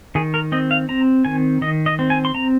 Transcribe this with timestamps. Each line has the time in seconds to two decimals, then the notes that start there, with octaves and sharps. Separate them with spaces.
0.15 D#3 G#4
0.34 A#4
0.52 C4 D#5
0.71 F5
0.89 C4 A#5
1.25 D#3 G#5
1.62 D#3 D#5
1.86 D#5
1.99 C4
2.10 G#5
2.25 C6
2.35 C4 A#5